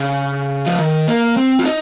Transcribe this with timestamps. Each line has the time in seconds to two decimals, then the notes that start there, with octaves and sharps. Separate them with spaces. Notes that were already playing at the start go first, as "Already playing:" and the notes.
Already playing: C#3
0.66 F3
0.79 D#3
1.08 A#3
1.37 C4
1.59 F4
1.65 D#4